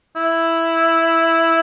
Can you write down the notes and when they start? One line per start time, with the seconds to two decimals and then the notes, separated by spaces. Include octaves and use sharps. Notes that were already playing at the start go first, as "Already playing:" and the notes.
0.16 E4